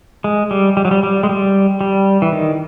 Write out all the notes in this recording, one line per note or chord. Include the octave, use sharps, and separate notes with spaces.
G#3
G3
G3
F#3
G3
G3
G#3
G3
G3
E3
D#3